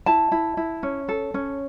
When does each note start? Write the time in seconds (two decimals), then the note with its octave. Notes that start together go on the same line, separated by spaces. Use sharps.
0.06 E4 A5
0.32 E4
0.57 E4
0.83 C#4
1.09 A4
1.34 C#4